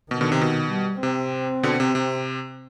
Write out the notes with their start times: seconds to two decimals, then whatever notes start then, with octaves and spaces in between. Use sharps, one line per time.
0.11 B2 D#3
0.21 B2 D3
0.32 C3
0.41 B2
0.71 G3
1.02 C3 C4
1.63 B2 D3
1.80 C3
1.95 C3